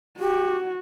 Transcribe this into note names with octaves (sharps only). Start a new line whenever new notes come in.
F#4 G4